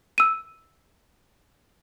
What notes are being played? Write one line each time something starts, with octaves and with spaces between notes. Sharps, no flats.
E6 D#7